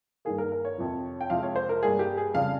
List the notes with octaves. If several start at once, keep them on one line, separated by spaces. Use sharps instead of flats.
G2 D#3 A#3 G#4
A#4
A#4
C#5
F2 C3 F3
G5
F2 C3 F3 G#3 F5
C#5
C5
A#4
G2 G3 A#3 G#4
G4
G#4
F2 C#3 G3 F5